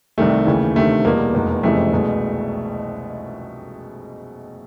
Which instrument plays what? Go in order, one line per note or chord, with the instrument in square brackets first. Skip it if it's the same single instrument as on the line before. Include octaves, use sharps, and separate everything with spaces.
[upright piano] C2 C3 D#3 G3 A3
D#2 C#3 E3
D2 C3 D#3 A3
E2 B2 G3 A#3
F1 E2 B2 G#3
F#1 F2 C3 E3 G#3 A3
C2 B2 G#3